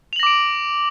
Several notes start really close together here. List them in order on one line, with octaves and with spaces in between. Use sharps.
F7 F#7 A#6 D6 D7